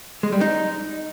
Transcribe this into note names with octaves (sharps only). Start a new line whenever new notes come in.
G#3
G3
D#4